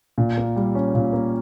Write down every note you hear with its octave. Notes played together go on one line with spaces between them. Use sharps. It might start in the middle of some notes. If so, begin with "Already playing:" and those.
A#2
A#3
G3
C#4
A#2
A#3